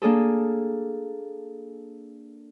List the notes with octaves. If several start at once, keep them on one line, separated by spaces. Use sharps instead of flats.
A#3 D4 G#4 A4